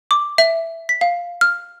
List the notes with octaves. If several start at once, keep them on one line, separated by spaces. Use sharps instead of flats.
D6
E5
B6
F5
F6